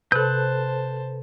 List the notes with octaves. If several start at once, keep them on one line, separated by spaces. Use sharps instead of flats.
C3 A4 B4 C5 A5 F#6 G6